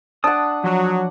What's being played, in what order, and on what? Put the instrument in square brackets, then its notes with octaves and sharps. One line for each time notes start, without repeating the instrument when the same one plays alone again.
[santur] D4 F#5 [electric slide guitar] G5 A5 [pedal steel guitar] D#6
[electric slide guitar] F3 [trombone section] F#3